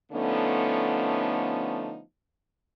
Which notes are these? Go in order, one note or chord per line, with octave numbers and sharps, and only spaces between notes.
D3 F3 A3 B3 C#4 D#4